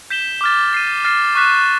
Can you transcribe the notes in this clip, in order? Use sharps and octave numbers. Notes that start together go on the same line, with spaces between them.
G6 B6 E7 G7
D6 F6 A6
A6 C7 D#7
F6 A6 C7
C#6 F#6 B6 E7